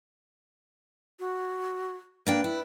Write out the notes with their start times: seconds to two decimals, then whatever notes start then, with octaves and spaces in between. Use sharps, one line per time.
1.19 F#4
2.27 A#3 D4 B4 G5
2.44 E4